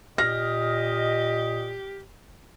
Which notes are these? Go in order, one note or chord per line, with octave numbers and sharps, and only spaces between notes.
A#2 G4 D#5 F6 A#6